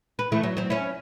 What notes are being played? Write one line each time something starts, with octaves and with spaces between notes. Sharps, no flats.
B4
E3 A3 E4
F#3
F#3 C4
C#4 E4